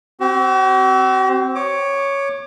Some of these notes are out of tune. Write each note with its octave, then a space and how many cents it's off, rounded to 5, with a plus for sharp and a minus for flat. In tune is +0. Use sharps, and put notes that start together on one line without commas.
C4 +0 F#4 +45
C#5 +0 D6 +30